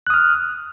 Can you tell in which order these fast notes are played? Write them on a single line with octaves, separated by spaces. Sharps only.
F#6 D#6 F6